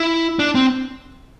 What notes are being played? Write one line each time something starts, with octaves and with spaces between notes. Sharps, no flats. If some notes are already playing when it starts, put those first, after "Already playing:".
Already playing: E4
D4
C4